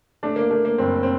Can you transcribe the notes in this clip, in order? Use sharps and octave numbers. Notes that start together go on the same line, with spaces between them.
A3 D4
A#3
A3 A#3
A#3
F#1 C4
C4